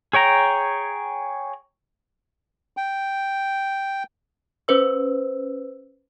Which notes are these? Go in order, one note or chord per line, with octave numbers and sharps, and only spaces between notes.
G#4 C#5 G5 A#5
G5
C#4 B4 C5 E6